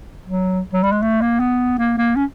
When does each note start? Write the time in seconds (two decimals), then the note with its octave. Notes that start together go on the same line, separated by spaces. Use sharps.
0.26 F#3
0.73 F#3
0.83 G3
0.92 G#3
1.02 A3
1.22 A#3
1.40 B3
1.79 A#3
1.98 A#3
2.16 C#4